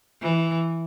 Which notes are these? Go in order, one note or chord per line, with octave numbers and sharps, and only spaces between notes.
E3